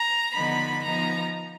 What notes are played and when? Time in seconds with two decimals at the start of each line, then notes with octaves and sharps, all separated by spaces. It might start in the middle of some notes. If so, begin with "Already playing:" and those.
Already playing: A#5
0.33 D3 F3 B3 D#4 B5
0.81 F3 B3 D#4 A#5